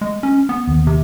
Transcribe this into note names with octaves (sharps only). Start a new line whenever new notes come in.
G#3
C#4
B3
D#2
C3